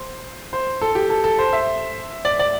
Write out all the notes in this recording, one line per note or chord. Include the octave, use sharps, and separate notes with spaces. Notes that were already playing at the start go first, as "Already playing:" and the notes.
Already playing: C5
C5
A4
G4
A4
A4
C5
E5
D5
D5